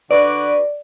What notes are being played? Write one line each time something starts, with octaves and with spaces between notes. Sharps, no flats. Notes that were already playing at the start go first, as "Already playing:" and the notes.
D3 F#4 B4 D5